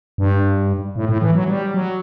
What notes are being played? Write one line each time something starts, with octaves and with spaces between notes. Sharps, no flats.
G2
A2
A2
E3
F#3
G3
F#3